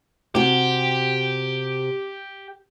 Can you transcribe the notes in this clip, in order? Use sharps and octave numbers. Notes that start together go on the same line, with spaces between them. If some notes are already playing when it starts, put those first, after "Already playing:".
C3 F#4 G4